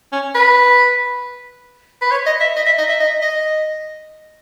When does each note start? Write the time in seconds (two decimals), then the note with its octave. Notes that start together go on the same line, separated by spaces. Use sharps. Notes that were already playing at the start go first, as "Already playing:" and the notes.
0.12 C#4
0.35 B4
2.02 B4
2.11 C#5
2.27 D#5
2.41 E5
2.56 D#5
2.66 E5
2.79 D#5
2.89 E5
3.00 D#5
3.22 D#5